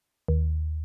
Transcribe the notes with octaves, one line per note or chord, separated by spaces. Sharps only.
D#2